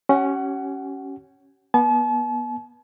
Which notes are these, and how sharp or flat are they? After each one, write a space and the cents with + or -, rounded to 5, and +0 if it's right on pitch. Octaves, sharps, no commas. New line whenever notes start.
C#4 -5 G4 -45 F#5 +25
B3 -25 A5 -40